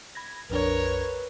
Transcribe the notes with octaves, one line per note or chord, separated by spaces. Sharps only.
B5 G#6 A#6
A#1 F2 D4 A#4 B4 C#5